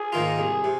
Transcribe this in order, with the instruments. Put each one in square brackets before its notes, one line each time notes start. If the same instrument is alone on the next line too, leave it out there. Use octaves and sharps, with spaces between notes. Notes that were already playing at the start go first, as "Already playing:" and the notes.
Already playing: [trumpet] G#4
[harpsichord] G#2 D#3 A#3 F4
[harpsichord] C2 [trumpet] G#4
[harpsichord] C3